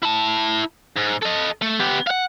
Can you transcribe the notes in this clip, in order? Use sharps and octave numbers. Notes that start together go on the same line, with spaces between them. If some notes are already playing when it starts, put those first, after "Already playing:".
E4 A5
G#2
A4 D#5
A3
B3 G4
F5 F#5